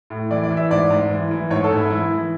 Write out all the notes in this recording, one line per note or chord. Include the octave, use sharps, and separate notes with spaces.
A2
E3 D5
D5
E3
E5
G#2 D5
G#2
E3
E3
G#2 C#5
A4
G#2
E4
E3 E4
E3